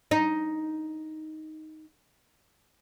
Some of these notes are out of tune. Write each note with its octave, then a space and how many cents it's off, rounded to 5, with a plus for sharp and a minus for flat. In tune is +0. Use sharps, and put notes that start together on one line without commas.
D#4 +5